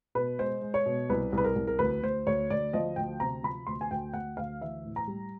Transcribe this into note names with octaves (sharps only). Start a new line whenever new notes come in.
B2 B4
G#3 C5
G#3
C#5
B2
C2 B4
C2
B4
A#4
C2
A#4
D2 B4
D2 C5
D2 C#5
D2 D5
F3 D#5
D2 G5
C3 A#5
F3 B5
D2 C6
G#5
D2 G5
D2 F#5
D2 F5
E3 E5
A2
A#5
G3